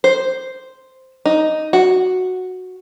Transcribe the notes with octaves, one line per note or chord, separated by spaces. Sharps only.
C5
D#4
F#4